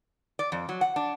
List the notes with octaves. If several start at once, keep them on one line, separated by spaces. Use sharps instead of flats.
D5
F2
F#3
F#5
D4